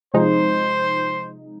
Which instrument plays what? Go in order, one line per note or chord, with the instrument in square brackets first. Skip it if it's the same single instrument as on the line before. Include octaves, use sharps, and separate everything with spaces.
[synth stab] C3 F3 G#3 D#4 [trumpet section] C5